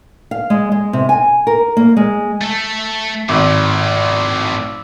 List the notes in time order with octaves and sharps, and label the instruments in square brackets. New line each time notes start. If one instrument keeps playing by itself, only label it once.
[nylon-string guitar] F5
G#3
G#3
C3
G#5
A#4
A#3
G#3
[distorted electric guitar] A3 A4
[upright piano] G#1 [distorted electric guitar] A2 F3 [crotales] D6 E6